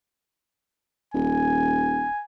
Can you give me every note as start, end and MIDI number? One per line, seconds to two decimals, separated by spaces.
1.14 2.07 27
1.14 2.23 80